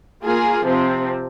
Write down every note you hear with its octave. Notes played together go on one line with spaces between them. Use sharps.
A#3 F4 G#4
C3 F3 C4